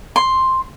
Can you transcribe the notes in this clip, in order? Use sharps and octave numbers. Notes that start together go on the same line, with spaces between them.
C6